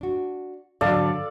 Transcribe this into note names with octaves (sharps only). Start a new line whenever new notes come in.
D4 F#4
G#2 D3 F#3 A4 D5 F5